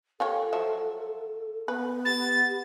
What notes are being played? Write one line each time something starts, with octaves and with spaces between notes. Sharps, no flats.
F4 G4 A4 C#5
F3 F#3 E5
B3 B4
G4 A6